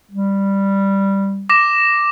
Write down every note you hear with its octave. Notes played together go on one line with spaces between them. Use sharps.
G3
D6 A#6 E7